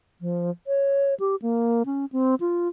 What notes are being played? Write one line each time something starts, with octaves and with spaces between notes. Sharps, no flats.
F3
C#5
G4
A#3
C#4
C4
F4